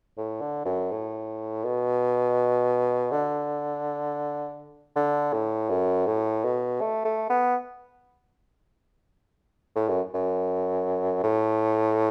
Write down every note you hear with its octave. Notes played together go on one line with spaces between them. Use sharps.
A2
D3
F#2
A2
B2
D3
D3
A2
F#2
A2
B2
A3
A3
B3
A2
F#2
F#2
A2